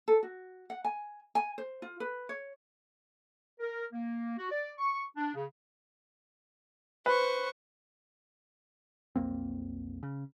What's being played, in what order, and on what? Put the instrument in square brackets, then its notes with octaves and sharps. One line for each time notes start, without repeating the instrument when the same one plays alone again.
[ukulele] A4
F#4
F#5
G#5
G#5
C5
F4
B4
C#5
[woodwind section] A#4
A#3
F#4
D5
C#6
D4
C#3
[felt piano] B4 [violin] C5 C#6
[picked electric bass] B1 F2 A#3 C4
C#3